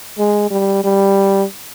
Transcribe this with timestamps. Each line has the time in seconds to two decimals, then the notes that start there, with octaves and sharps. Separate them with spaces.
0.18 G#3
0.51 G3
0.84 G3